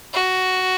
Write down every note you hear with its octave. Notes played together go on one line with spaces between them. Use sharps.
F#4